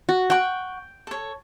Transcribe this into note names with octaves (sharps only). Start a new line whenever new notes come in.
F#4
F#5 G5 C#6
A4 C#5